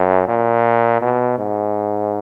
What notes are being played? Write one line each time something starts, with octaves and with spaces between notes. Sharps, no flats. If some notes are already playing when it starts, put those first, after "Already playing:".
Already playing: F#2
A#2
B2
G#2